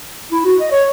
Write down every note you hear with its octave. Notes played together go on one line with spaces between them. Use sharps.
E4
F#4
D#5
C#5